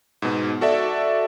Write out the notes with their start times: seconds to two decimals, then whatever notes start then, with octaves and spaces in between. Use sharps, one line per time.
0.22 G#2 B2
0.61 F#4 A4 D5 E5